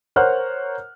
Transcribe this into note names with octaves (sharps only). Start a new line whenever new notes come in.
A#4 C5 C#5 F#5 F6 F#6